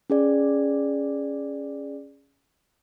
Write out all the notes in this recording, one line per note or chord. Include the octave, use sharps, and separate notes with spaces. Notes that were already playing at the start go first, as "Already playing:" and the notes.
C#4 G#4 D5